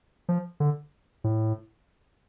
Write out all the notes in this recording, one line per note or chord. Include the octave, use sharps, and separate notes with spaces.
F3
D3
A2